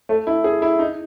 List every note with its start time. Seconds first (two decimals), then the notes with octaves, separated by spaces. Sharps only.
0.09 A3
0.27 E4
0.44 G#4
0.62 E4
0.79 D#4